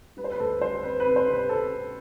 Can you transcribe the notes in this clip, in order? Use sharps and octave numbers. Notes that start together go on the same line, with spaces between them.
G3 B4
C5
B4
D2 A4
G3 C5
C4 B4
B4
C3
C5
C3 B4
C4 A4
C4